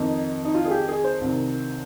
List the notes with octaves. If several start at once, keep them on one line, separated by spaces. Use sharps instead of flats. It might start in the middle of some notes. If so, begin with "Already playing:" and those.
Already playing: F2 D#3 D#4
D#4
F4
G#4
G4
G#4
C5
C2 C3 D#3